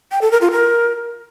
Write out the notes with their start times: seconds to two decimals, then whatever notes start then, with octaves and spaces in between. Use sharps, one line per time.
0.12 G5
0.21 A4
0.31 A#4
0.41 F4
0.51 A#4